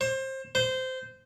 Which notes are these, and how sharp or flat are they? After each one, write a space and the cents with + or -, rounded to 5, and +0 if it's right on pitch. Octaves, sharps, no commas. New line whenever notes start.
C5 +25
C5 -15